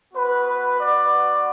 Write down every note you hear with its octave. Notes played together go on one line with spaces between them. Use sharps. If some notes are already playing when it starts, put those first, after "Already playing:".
B3 F#4 B4
D5